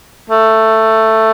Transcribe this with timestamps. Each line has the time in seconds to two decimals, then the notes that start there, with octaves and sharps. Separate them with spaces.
0.30 A3